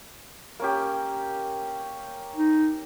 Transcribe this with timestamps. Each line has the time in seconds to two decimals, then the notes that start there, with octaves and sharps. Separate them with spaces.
0.60 A#3 C#4 G4
2.36 D#4